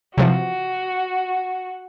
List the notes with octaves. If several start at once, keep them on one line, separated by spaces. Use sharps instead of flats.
C3 E3 F3 F#4